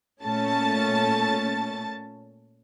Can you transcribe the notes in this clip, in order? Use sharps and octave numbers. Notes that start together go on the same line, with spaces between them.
A#2 A3 C#4 A5 A6